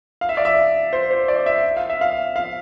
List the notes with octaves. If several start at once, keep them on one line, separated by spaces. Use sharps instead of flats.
F5
E5
D5
E5
C5
C5
D5
E5
F5
E5
F5
F5